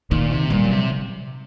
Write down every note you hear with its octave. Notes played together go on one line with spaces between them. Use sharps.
A#2 D#3
C3
A#2 G3
F#3
C3